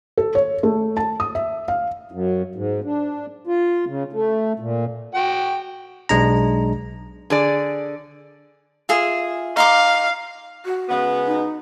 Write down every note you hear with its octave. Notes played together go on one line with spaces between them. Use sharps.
A4
C#5
A3
A5
D#6
E5
F5
F#2
G#2
D4
F4
C#3
A3
A#2
F#4 G5
B1 G#3 D4 A#5
D3 G#4 D5
F4 G#4 E5
D#4 F5 C6 D6
F#4
C#3 G#3 B3
D#4